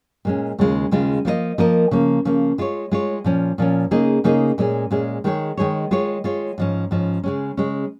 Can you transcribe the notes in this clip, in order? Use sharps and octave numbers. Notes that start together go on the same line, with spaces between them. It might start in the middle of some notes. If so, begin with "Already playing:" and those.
A#2 G#3 C#4
D#2 C#3 G#3 F4
D#2 C#3 G#3 F4
F3 A#3 F4 A#4 D#5
F3 A#3 F4 A#4 D#5
C#3 F3 A#3
C#3 F3 A#3
G#3 F4 C#5
G#3 F4 C#5
A#2 F3 C#4
A#2 F3 C#4
C#3 A#3 D#4 G#4 D#5
C#3 A#3 D#4 G#4 D#5
A#2 G#3 C#4 G#4
A#2 G#3 C#4 G#4
D#3 G#3 D#4 G#4 C#5
D#3 G#3 D#4 G#4 C#5
G#3 F4 C#5
G#3 F4 C#5
G#2 F3 C#4
G#2 F3 C#4
C#3 G#3 C#4
C#3 G#3 C#4